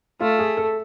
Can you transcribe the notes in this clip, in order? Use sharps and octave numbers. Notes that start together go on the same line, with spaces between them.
A3 F4
G#4
A4